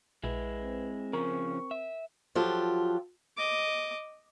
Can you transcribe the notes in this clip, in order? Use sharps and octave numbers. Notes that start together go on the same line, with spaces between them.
A#1 G#3 E4 B4
C4
C#3 F3 C#4 A#4 C#6
E5
F3 F#3 F4 G4 A4
D#5 D6